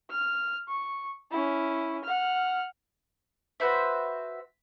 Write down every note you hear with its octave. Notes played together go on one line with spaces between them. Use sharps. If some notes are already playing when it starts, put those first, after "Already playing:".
F6
C#6
C#4 E4
F#5 F6
F#4 B4 C5 E5